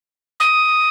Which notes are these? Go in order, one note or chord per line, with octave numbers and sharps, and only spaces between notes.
D#6